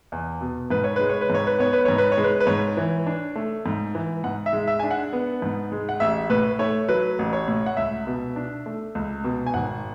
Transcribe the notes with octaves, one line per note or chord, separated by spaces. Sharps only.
E2
B2
G#2 B4
C#5
G#3 B4
C#5
B4
G#2 C#5
B4
B3 C#5
B4
G#2 C#5
B4
C#5
G#3
B4
B4
G#2 C#5
E3
D4
A3
G#2
E3
G#2 F#5
E5
G#3
E5
D4 G#5
F#5
B3
G#2
G#3
F#5
A1 E5
A2 B4
A3 C#5
F#3 B4
A1
C#5
A2
F#5
C#2 E5
B2
D4
A3
C#2
B2
G#5
G#1 F#5